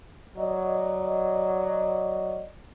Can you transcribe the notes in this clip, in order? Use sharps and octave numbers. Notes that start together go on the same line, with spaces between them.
F#3 D5 D#5